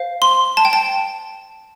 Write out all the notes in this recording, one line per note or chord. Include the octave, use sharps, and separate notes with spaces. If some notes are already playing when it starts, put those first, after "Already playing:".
Already playing: C5 F5
C6
A5
G5
A5